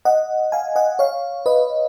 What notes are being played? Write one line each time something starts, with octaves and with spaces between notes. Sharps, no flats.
D#5 F#5
F5 G#5
D#5 F#5
C#5 F5
B4 D#5